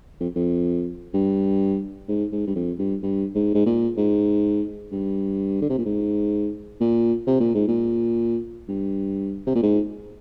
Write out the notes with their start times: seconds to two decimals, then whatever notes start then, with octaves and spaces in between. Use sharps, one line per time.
0.20 F2
0.35 F2
1.14 G2
2.09 G#2
2.33 G#2
2.47 G2
2.56 F2
2.79 G2
3.03 G2
3.35 G#2
3.54 G#2
3.66 A#2
3.97 G#2
4.92 G2
5.62 D3
5.69 C3
5.78 A#2
5.85 G#2
6.80 A#2
7.27 C3
7.40 A#2
7.54 G#2
7.68 A#2
8.69 G2
9.47 C3
9.55 A#2
9.63 G#2